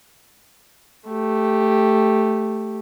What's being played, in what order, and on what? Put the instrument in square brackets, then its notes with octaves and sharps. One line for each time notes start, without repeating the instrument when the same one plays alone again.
[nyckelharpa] A3 G4